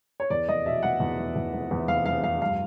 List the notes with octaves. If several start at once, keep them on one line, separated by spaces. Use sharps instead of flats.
C#5
E2 D5
F1 D#5
B2 E5
F1 F#5
E2
F1
E2
F1
E2
F1 F5
F1 F5
F1 F5
G2 F5